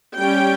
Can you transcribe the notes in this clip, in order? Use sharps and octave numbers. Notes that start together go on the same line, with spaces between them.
G3 C#4 G5